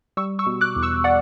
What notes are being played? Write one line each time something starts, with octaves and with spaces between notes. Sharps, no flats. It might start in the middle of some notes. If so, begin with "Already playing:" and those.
G3 C#6 E6
C#6 E6
B2
D6 F#6
E2
C#6 E6
D5 F#5